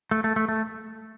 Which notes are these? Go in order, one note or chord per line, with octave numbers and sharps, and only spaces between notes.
A3
A3
A3
A3